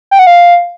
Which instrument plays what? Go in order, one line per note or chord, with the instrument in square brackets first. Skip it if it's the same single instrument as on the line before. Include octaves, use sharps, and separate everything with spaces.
[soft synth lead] G5
F#5
F5